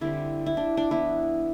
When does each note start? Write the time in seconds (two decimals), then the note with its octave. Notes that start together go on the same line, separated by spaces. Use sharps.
0.01 D3 G3 C4 E4
0.46 E4
0.57 D4
0.77 D4
0.91 E3 B3 E4